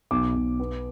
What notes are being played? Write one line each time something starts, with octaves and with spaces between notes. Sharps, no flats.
B1 D6
B1
B3